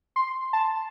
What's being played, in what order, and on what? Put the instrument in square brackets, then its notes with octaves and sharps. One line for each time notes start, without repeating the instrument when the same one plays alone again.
[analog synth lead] C6
A5